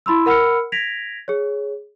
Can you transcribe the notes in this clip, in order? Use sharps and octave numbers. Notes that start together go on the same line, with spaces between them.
E4 B5 C6 E6
A#4 F#5 B5 E6 F6 C#7
G#6 A#6 B6 D7 F7
G#4 C#5